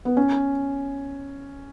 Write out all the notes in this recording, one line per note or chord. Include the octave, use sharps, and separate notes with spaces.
B3
C#4